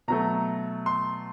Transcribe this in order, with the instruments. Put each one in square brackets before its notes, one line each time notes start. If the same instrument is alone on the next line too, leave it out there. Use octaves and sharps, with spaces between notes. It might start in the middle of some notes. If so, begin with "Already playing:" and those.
[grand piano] B2 F#3 A3 A#5
C6